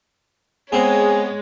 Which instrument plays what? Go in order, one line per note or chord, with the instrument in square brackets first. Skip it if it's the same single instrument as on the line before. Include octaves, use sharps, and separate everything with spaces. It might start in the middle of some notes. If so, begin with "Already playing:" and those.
[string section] G#3 [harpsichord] B3 C4 C5 [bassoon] G#4 [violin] C#5